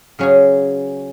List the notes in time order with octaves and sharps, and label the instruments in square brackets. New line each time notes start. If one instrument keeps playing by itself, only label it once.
[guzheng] C#3 F#3 C#4 G#4